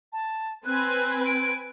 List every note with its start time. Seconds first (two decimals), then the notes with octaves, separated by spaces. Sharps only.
0.13 A5
0.66 C4 B4 G#5 F#6
1.26 D7